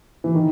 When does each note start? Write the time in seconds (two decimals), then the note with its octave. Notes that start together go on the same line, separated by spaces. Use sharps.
0.24 E3
0.35 D#3